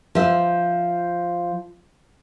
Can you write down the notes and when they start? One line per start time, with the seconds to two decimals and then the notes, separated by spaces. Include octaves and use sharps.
0.15 F3 E5